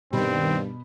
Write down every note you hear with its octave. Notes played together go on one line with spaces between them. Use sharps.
G2 B2 D#3 G3 C4 B5